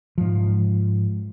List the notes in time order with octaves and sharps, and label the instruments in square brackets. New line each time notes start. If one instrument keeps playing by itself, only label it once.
[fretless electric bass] G#2 F3